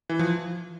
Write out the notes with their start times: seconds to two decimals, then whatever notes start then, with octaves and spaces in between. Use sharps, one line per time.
0.09 E3
0.19 F3